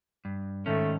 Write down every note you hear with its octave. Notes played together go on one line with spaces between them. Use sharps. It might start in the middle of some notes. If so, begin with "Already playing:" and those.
G2
G#2 D#3 A3 C#4